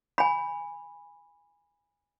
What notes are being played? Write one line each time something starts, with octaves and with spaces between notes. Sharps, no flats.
G#5 B5